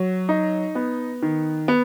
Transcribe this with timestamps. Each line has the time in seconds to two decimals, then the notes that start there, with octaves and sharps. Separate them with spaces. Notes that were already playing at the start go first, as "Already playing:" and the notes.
Already playing: F#3
0.29 D#4
0.75 B3
1.22 D#3
1.68 B3